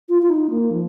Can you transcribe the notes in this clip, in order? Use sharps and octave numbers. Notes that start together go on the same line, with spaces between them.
F4
F4
D#4
A#3
F3